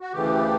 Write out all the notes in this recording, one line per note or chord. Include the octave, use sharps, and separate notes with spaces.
F#4
D2 C#3 E3 A3 G4